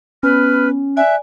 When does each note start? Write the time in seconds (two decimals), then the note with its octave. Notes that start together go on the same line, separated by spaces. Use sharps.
0.23 B3 C#4 B4 F6
0.97 D5 E5 G#5 F#6